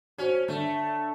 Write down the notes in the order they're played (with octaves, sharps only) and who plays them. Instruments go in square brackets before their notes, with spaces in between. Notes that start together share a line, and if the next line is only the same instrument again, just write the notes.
[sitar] C#4 [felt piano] F#4 C5
[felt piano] D3 [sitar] A3